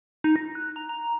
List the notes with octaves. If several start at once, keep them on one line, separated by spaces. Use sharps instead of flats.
D#4
A#6
F#6
A#5
A#5